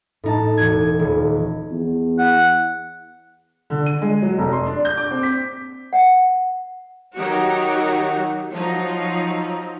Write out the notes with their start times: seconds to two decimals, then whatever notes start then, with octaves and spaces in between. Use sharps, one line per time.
0.24 A2 D#4 A5
0.58 E1 F#4 G#6
0.99 D#1
1.71 E2
2.18 F#5
3.70 D3
3.86 D#7
4.02 G#3
4.22 F#3
4.38 F1
4.52 C6
4.66 D4
4.85 G6
4.97 D6
5.11 C4
5.23 B6
5.93 F#5
7.14 D#3 F#3 D#4 F#4 G4
8.53 F3 F#3 D#4